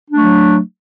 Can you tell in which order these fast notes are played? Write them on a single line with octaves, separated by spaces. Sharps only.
D4 A3 F#3